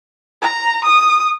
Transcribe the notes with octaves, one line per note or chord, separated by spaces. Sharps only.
A#5
D#6